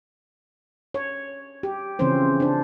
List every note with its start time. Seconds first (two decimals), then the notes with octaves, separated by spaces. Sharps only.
0.94 C#5
1.63 G4
1.99 C#3 E3 F3 C4 C#4 C5
2.40 D4 C5